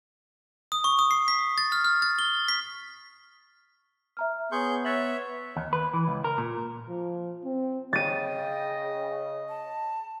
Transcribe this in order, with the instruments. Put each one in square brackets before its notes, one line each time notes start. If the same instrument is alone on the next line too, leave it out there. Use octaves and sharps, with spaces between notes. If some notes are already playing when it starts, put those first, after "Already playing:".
[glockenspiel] D#6
C#6
D#6
C7
B6
A6
F6
F6
A6
G7
B6
[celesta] E5 A#5 F6
[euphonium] B3 [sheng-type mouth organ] G#4 C#6 G6 [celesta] C#5 C6
[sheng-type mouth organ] C#5 E5 [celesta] F#6 A6 F#7
[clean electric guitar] D#2
B4
E3
C#2
A#4
A#2
[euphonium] F3
C4
[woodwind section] C#3 [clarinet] D#5 [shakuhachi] G5 [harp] A6 D#7
[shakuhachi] A5